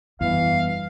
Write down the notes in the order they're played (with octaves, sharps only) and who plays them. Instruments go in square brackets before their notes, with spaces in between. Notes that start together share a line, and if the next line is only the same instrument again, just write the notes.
[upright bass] F#1 G2 [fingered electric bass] E2 [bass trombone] E3 [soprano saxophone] F5